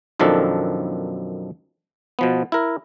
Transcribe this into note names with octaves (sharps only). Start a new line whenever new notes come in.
B1 F#2 D#3 F3 D4 A4
B2 F3 B3
E4 A#4